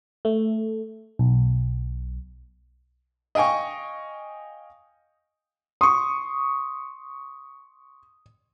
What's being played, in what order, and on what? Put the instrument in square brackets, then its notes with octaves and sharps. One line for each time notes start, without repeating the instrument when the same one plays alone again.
[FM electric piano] A3
B1
[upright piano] D#5 F5 G5 G#5 C#6
[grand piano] C6 C#6 [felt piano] D#6